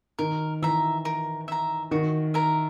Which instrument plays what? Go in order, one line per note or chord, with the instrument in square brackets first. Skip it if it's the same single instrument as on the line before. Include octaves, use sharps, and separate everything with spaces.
[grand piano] D#3 [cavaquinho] A#4
[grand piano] E3 [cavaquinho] E5 A#5
[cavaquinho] A#4
E5 A#5
[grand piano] D#3 [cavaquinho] F#4
[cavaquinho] A#4 E5 A#5